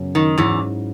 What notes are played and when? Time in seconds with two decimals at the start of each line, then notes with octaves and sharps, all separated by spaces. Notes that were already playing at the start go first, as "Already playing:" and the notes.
Already playing: F#2 C#3 F#3 B3
0.15 D#3
0.38 E2 G#2 E3 F#3 C#4 E4